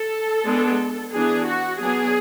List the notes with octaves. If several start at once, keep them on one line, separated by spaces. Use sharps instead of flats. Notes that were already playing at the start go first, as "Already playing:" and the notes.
Already playing: A4
G#3 B3 D4
E3 B3 D4 G#4
F#4
F#3 B3 D4 G#4